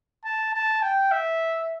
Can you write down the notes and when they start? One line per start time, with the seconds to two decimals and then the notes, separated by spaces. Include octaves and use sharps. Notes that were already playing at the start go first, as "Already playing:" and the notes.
0.25 A5
0.54 A5
0.82 G5
1.11 E5